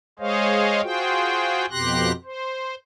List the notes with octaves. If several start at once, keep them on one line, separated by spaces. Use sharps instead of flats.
G#3 G#4 C5 C#5 D#5 F5
F4 F#4 G#4 C5 G5
F2 B2 G4 C6 F#6 A#6
C5